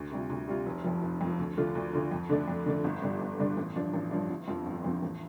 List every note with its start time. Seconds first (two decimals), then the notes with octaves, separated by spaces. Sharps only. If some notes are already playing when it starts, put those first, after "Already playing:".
Already playing: D2
0.11 C3 G3 F4
0.30 D2
0.48 C3 G3 F4
0.66 F1
0.84 F2 F3
1.02 F1
1.21 F2 F3
1.39 D2
1.57 D3 A3 F4
1.75 D2
1.93 D3 A3 F4
2.11 F2
2.30 D3 A3 D4
2.48 F2
2.66 D3 A3 D4
2.84 G1
3.02 G2 D3 G3 D4
3.21 G1
3.39 G2 D3 G3 D4
3.57 A1
3.75 G2 F3 D4
3.94 A1
4.11 G2 F3 D4
4.30 G1
4.48 F2 F3 C4
4.66 G1
4.84 F2 F3 C4
5.02 A1